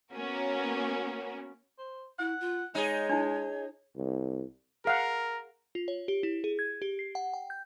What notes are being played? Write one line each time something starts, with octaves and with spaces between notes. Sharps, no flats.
A#3 B3 C#4 F#4 A#4
C5
E4 F#5
F4
G#3 D#4 G#4 C#5
D4 E4
C2
G#4 A#4 F5 F#5
F4
C#5
G4
E4
G#4
G#6
G4
C7
F#5
G5
G6